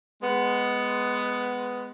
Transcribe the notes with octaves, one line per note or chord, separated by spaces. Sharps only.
G#3 B3